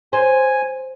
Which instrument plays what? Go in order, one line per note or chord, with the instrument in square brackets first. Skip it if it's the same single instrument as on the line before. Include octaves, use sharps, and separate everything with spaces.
[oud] C5 [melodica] G#5